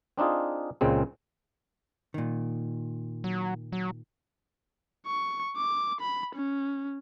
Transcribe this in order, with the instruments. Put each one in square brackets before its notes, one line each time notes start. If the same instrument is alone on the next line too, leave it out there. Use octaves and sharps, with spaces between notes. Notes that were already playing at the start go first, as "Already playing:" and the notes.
[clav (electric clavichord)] C4 D4 D#4 F4 G#4
C#2 A#2 C#3 G#3 C4
[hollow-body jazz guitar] A#2 D#3
[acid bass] F#3
F#3
[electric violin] C#6
D6
B5
C#4